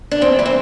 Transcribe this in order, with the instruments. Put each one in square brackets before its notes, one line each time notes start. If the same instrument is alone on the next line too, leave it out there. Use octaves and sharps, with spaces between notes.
[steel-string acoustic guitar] D4
E2 C4
E3 G3
C4